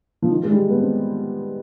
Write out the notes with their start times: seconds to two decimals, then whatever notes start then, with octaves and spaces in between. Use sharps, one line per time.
0.22 F3
0.30 D#3
0.43 G#3
0.50 G3
0.69 B3
0.80 C4